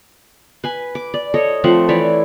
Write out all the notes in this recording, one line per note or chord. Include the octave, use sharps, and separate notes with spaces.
B4 G#5
D6
D5
A4 C#5 D#5
F3 A3 C4 F#5
E3 E4 C#5 D5